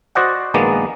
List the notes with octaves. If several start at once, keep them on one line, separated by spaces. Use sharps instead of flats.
F#4 C5 D5 D#5 F#5
A#1 D#3 G#3 A#3 B3 D5